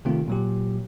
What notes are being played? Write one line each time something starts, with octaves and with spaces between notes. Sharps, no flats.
C3 D#3 A3 C4 F4
A#2 F#3 G4